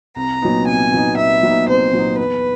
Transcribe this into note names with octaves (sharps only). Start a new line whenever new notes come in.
C2 A#5
A#2 F#3 B3 D#4
C2 G#5
A#2 F#3 B3 D#4
C2 E5
A#2 F#3 B3 D#4
C2 C5
A#2 F#3 B3 D#4
E2 B4